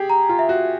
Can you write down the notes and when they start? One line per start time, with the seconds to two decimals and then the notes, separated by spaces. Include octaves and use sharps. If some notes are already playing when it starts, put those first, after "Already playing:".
Already playing: G4 G#4
0.10 A#5
0.29 F4
0.39 E5
0.49 F#4